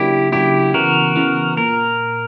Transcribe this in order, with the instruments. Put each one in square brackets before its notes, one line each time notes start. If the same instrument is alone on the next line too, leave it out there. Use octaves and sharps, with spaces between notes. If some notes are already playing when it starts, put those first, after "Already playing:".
Already playing: [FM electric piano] C#3 F#3 A#3 D4 F#4 [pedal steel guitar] E4 G4
[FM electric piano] C#3 F#3 A#3 D4 F#4 [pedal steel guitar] E4 G4
[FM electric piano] C#3 E3 B3 [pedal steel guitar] F#4 A#4
[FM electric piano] C#3 E3 B3
[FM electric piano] A#2 [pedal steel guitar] A#4